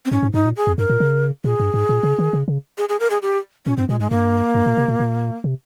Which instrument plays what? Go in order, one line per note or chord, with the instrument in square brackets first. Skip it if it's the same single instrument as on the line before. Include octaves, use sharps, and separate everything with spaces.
[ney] C4
[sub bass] G#2 [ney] C#4
[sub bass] G#2
[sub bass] G2 [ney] D#4
[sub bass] G#2
A#2
[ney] G#4
[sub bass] F2
[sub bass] G2 [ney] A#4
[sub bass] A#2
C#3
[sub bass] A#2 [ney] G#4
[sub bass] G2
G#2
A#2
C#3
D#3
C#3
C#3
[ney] G#4
G#4
A#4
G#4
G4
[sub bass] A#2 [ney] C#4
[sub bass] G2 [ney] C4
[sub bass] A#2 [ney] G#3
[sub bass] G#2 [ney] G#3
[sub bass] G2 [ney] A#3
[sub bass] G2
A#2
C3
A#2
A#2
C3